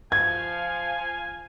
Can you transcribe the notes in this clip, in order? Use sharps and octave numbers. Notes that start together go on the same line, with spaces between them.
F3 F5 G#5 G#6